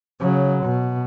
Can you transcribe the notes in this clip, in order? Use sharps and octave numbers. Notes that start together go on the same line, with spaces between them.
C#3 F#3
B2